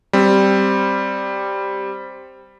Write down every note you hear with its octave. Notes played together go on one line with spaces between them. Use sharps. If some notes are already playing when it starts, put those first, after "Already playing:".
G3 C4